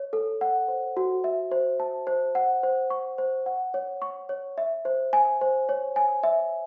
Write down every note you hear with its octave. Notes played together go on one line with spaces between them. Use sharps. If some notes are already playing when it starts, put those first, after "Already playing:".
Already playing: C#5
A4
F#5
C5
F#4
E5
C5
A5
C5
F#5
C5
C#6
C5
F#5
C#5
C#6
C#5
E5
C5
G#5
C5
C#5
G#5
E5